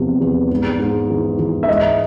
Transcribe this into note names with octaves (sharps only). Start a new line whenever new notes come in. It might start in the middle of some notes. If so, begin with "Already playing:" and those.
Already playing: E2 C3 F3
E2
G#2
G#2
E3
E3
E5
G#2 D#5